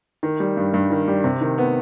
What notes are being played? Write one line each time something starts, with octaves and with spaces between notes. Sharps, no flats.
D#3
G3
G2
G2
D#3
G3
C3
D#3
B3